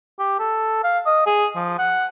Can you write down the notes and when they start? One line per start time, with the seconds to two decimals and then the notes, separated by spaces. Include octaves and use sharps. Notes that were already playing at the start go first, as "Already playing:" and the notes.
0.19 G4
0.40 A4
0.84 F5
1.06 D#5
1.26 G#4
1.55 F3
1.78 F#5